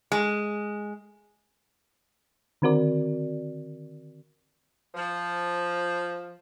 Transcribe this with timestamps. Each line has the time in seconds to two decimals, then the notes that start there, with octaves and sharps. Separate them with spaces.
0.12 G#3
2.62 D3 D#3 C4 F#4 A#4 D5
4.95 F3